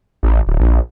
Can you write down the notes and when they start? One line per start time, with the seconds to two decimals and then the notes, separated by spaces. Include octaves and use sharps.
0.23 A1
0.47 D1
0.60 A#1